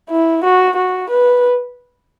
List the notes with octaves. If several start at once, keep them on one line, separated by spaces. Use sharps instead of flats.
E4
F#4
F#4
B4